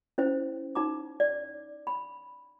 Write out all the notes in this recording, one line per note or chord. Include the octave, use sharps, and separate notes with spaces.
C#4 E4 C5
D#4 A#5 D6
D5
B5